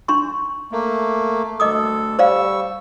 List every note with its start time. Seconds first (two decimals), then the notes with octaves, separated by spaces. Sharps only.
0.08 D4 C6 C#6
0.72 A3 A#3
1.60 D2 A4 D#5 D6 D#6
2.19 G3 C5 D5 F5 C#6 E6